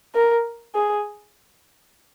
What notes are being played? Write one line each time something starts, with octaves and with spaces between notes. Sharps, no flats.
A#4
G#4